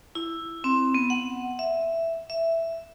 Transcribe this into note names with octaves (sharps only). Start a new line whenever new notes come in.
E4
C4
B3
F#5
E5
E5